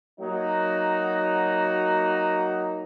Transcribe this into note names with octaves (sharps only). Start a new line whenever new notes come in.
F#3 A#3 D#4 F#4